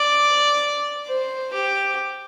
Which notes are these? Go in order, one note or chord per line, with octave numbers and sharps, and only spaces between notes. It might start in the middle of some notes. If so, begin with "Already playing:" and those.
Already playing: D5
C5
G4